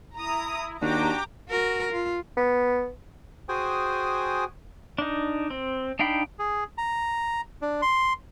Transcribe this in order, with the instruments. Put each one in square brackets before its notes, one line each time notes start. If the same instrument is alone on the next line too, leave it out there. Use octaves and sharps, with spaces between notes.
[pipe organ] E4 [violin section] A#5 D#6
[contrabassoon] D#2 [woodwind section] D4 F#4 [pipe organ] G4 G5 D6 [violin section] A#5
[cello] F#4 A#4
F4
[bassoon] B3
[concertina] F#4 G#4 C5 G5 G#5 D#6
[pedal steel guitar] D4 D#4
C4
D4 D#4 F5 G5 B5
[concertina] G#4
A#5
D4
C6